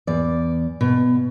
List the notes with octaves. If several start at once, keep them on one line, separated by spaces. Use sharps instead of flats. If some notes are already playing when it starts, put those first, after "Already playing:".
E2 D5
B2